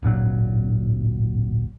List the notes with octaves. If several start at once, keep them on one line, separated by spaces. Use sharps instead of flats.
D1 G#1 A#2 F#3